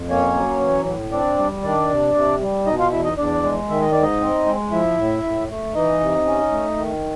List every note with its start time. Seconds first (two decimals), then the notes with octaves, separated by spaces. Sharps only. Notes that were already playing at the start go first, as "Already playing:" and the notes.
Already playing: F2
0.09 A#3 C#4 C#5
0.35 F#3
0.60 E3
0.86 A2
1.12 C4 D4 D5
1.38 G3
1.63 D#3 D4 D5
1.90 C3
2.15 C3
2.40 G3
2.66 B2 D#4 D#5
2.79 F4 F5
2.92 E2 E4 E5
3.05 D#4 D#5
3.18 E2 D4 D5
3.43 G#3
3.69 D#3 E5
3.80 D#5
3.92 G#2 D5
4.02 D#4 D#5
4.21 C4
4.46 G#3
4.72 F3 E4 E5
4.98 A2
5.23 A2
5.49 A3
5.74 E3 D#4 D#5
6.00 C3
6.26 C#4
6.52 A3
6.77 D#3